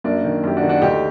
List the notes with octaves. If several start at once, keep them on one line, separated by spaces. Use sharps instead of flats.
F#2 A#3 D4
D#3
F#2 G4
D4 F#4
D#3
D4 F#4
D2 D#4 G4